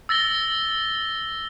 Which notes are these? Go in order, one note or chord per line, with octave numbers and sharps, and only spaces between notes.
E6 A6 A#6 G7